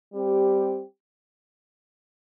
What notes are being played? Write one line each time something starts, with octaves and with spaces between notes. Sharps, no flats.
G3 C4 G4